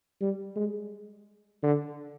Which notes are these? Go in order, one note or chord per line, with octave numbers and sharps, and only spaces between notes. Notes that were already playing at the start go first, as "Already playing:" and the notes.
G3
G#3
D3